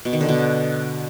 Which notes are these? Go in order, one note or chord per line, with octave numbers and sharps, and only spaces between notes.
B2
D#3
D3
B2